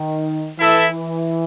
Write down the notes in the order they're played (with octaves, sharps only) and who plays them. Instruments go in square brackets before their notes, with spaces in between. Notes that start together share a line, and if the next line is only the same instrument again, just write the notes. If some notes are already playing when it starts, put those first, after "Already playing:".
Already playing: [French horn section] D#3
[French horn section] E3 [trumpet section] E4 A4 E5